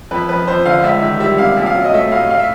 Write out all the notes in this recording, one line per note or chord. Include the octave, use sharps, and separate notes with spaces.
F2 B4
F3 B4
F2 C5
D3 F5
C#2 E5
D#3 E5
G3 E5
C3 F5
A#1 E5
F5
F#3
D#5
A3 E5
A2 F5
F5
E5